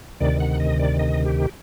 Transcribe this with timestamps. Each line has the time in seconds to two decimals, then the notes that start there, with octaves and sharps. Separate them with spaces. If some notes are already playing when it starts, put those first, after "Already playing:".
0.20 D2 C3 D#3 D5
0.40 F#5
0.60 D#5
0.80 D5
0.99 D#5
1.26 G4